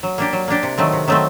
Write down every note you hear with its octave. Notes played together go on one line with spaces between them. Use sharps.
F#3
A#3 D4 G4
F#3
A#3 D4 G4
C3
D#3 F#3 A3 C4
C3
D#3 F#3 A3 C4